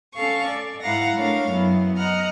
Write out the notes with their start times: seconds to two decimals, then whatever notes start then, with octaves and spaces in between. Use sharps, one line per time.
0.14 C#4 A4 F5 C#6
0.47 D5
0.82 G#2 E4 F5 F#5 A#5 A#6
1.16 A3 D4 A#4 C#5 F5
1.49 F#2 B3 E4
1.97 D#5 F#5 A#5 F6